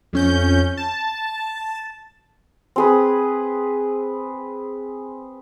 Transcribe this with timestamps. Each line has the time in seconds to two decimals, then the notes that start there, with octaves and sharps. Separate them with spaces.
0.13 F2 C#4 G6
0.77 A5
2.76 C4 G#4 B4